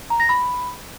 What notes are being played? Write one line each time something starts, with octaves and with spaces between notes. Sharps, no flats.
A#5
A#6
B5